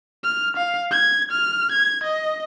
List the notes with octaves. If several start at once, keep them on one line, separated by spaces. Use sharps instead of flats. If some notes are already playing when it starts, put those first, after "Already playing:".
F6
F5
G#6
F6
G#6
D#5